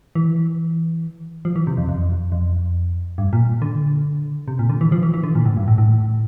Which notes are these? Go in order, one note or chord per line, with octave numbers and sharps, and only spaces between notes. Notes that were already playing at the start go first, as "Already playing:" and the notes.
E3
F3
E3
C3
F2
F2
F2
G2
A#2
D3
C3
A#2
D3
E3
F3
E3
E3
D3
A#2
A2
G2
A2
A2